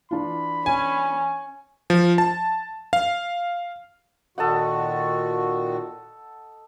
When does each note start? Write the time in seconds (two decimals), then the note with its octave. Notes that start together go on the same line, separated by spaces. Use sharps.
0.11 E3 D4 F4 B5
0.66 C#4 G#5
1.90 F3
2.18 A5
2.93 F5
4.38 A#2 D#3 F#4 A4 D#5 F#5